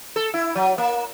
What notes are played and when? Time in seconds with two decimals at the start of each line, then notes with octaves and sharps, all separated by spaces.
0.16 A4
0.34 E4
0.55 F#3
0.78 A#3